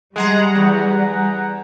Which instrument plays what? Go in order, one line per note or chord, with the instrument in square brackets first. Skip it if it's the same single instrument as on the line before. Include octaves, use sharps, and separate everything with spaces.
[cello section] G3 [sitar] G#3 [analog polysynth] G#4 F#5 A#5
[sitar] E2